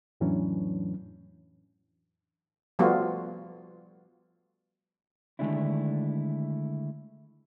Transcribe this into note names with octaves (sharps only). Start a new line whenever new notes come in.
F2 A2 E3 F#3 C#4 D4
F3 G3 A3 B3 F4 F#4
D3 D#3 G#3 A3 D4 E4